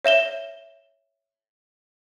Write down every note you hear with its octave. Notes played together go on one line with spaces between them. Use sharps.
C#5 E5 E7 G7